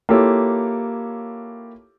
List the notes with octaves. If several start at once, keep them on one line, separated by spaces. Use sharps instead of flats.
A#3 E4 F4 G4 A4 C#5